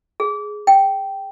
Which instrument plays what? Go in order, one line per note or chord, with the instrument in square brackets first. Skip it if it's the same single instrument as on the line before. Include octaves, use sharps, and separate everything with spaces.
[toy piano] G#4
G5